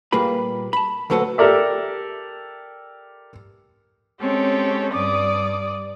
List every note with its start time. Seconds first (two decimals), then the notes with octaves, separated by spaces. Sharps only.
0.12 A#2 G3 A#3 G#4 B4 B5
0.73 A5 B5
1.10 D2 A#2 F#3 A4 B4 F#5
1.38 G4 A4 A#4 D5 E5
4.20 G#3 C4 C#4 G4 A4 C#5
4.93 G2 D5 D6 D#6